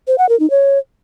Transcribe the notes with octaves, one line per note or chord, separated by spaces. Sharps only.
C5
F#5
A#4
D#4
C#5